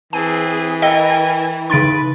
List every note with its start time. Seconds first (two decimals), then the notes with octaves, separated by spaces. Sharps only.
0.13 E3 C4 G#4 G#5
0.82 A#4 D#5 G5 G#5 E6 C#7 G7
1.70 C#3 D#4 B4 C6 A6 D7